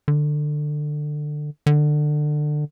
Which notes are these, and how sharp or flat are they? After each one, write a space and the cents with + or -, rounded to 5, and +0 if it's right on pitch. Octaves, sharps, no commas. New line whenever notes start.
D3 +20
D3 +25